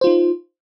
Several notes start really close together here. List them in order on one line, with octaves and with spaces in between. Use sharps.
C5 F4 D#4